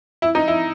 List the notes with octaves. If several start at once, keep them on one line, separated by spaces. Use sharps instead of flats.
E4
D#4
E4